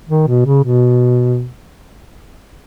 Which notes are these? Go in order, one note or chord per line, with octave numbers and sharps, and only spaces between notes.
D#3
B2
C#3
B2